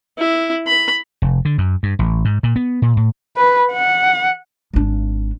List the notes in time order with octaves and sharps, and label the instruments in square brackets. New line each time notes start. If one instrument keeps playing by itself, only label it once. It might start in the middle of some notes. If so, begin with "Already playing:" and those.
[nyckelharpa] E4
B5
[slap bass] F1
D3
F#2
G2
A1
G#2
A#2
B3
A#2
A2
[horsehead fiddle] B4
F#5
[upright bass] G#1 D4